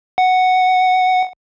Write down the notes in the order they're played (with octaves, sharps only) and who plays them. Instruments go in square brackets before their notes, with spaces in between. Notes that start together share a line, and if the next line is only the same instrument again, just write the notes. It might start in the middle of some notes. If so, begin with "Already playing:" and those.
[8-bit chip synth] F#5